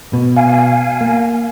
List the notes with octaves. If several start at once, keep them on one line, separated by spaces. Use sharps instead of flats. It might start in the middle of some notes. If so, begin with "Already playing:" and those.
B2
F5 G#5
A#3